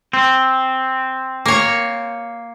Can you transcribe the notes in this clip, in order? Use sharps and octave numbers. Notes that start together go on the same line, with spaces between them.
C4
A#3 C#5